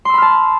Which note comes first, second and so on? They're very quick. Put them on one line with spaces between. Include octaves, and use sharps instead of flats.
C6 E6 B5 F6 A5